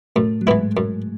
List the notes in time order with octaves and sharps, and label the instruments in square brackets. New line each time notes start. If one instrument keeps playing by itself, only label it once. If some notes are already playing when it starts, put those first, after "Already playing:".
[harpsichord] F#2 [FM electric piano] A2 A3
[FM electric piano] F#3
[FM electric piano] G#2 G#3 [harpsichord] E3 B3 E4
[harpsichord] F#2